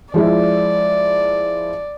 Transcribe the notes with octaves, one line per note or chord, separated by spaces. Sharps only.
F3 G#3 E4 D5